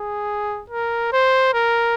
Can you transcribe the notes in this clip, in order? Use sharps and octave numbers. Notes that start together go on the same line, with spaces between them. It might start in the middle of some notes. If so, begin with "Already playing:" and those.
Already playing: G#4
A#4
C5
A#4